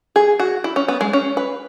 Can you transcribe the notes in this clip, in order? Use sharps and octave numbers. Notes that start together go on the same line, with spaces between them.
G#4
F#4
E4
C#4
B3
G#3
C#4
B4